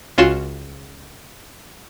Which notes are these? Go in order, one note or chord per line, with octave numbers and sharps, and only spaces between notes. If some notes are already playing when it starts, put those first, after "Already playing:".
C#2 C#4 F4 F#4 C6 E7